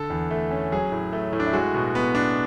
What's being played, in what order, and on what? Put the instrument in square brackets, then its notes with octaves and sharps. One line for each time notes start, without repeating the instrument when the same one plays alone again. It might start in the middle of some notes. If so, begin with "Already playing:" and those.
Already playing: [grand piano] D3 A4
E2
A3
C#4
F#3 G#4
A2
A3
A2
D4
E4
G#3 F#4
B2
B3
D4